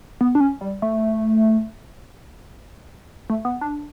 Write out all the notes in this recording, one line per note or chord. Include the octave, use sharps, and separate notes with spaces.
B3
D4
C#4
G3
A3
A3
B3
D4